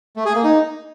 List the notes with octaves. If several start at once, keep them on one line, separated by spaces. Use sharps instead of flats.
A3
G#4
A#3
D#4